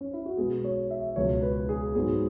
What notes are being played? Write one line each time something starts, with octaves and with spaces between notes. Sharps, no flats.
C#4
E4
F#4
B2 G#3 B3 G#4
C#5
E5
C#2 B2 F#3 C#5
B4
G#4
G#2 F#3 B3 G#4